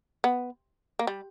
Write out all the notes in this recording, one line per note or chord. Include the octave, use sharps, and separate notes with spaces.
B3
A#3
G3